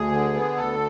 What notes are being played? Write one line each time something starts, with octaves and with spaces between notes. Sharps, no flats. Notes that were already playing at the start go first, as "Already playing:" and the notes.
Already playing: D2 G#4
D3
B3
D2 A4